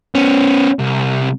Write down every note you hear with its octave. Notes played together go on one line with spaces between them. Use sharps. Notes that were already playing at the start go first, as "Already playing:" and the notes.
B3 C#4
C2